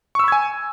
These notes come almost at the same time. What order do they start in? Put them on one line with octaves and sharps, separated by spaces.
C#6 E6 B5 G#6 G#5